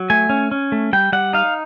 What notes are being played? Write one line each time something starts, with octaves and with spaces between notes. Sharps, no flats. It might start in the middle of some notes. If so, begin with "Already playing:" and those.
Already playing: F#3
A3 G#5
C#4
C#4
A3
G3 G5
G3 F#5
D#4 F5